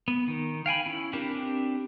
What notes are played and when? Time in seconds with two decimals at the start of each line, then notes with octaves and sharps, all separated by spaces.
0.08 B3
0.28 D#3
0.66 F5 G5 G#5 B5
0.86 C#4 E4
1.13 C4 D4 G4 A#4 B4